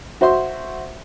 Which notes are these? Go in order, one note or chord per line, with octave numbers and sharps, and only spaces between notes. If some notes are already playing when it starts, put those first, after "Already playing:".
F#4 C5 E5 C6